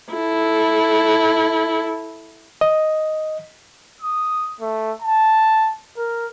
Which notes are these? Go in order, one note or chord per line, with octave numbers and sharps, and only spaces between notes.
E4 A4
D#5
D#6
A3
A5
A#4